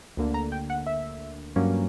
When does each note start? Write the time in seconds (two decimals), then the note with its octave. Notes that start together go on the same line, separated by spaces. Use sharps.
0.17 D2 D3 A#3
0.34 A#5
0.52 G5
0.70 F#5
0.87 E5
1.56 G2 F#3 A#3 C#4